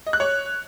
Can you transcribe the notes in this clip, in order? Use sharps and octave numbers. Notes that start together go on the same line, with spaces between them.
D#5
F#6
C#5